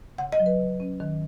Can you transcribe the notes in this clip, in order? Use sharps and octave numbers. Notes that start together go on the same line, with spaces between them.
C#3 F#5
D#5
F#3
B4
C#3
C#4
D#3